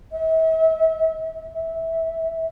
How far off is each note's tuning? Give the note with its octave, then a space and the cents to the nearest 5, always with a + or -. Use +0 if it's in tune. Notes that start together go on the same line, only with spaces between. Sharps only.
E5 -40
E5 -15